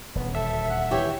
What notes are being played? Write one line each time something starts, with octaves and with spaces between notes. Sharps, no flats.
D#1 D2 B3
A4 E5
F#5
E3 G4 C#5